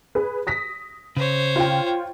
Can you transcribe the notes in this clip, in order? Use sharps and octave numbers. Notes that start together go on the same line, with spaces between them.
G#4 B4
D#6 A#6 B6
C#3 C5 C#5
F4 G5